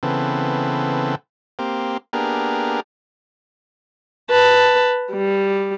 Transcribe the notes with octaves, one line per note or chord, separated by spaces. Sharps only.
C#3 E3 B3 C4 A4
A#3 C4 G4
A#3 B3 D4 G4 G#4 A#4
B4 A5
G3